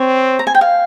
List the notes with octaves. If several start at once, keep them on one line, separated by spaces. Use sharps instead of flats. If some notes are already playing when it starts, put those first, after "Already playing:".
Already playing: C4 C#5
A#5
G#5
G5
F5